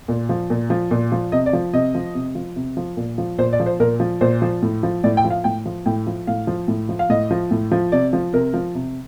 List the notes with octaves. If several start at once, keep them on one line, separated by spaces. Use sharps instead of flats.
A#2
F3
A#2
F3
A#2
F3
C3 D#5
D5
F3
C3 D#5
F3
C3
F3
C3
F3
A#2
F3
A#2 C5
D5
F3
C5
A#2 A#4
F3
A#2 C5
F3
A2
F3
A2 D5
G5
F3
F5
A2 G5
F3
A2 G5
F3
A2 F5
F3
A2
F3
F5
A2 D#5
F3
A2
F3
C3 D5
F3
C3 A#4
F3
C3